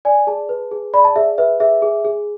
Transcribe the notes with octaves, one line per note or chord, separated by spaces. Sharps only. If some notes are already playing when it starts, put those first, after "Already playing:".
D5 G#5
G#4 A5
B4
G#4
D5 B5
A5
G#4 E5
B4 E5
G#4 E5
G#4
G#4